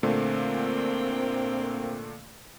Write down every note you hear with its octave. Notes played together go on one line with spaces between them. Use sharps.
A#2 D3 A3 A#3 C4